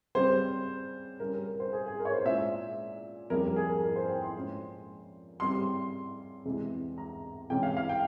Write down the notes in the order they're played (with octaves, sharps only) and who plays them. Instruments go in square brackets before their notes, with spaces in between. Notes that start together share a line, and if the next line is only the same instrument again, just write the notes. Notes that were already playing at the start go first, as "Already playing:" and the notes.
[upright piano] C#3 G3 C4 C5
C#3 G3 C#4 A#4
A#4
C5
G#4
G#4
A#4
C#5
C5
A#2 G#3 C#4 E5
F2 C#3 G3 A#3 A#4
A#4
G#4
A#4
A#4
C5
G5
C6
A#2 G#3 C#4
C#3 G3 C4 C6
E2 C3 E3 G#3
A#5
C3 E3 G#3 C#4 G5
F5
F5
G5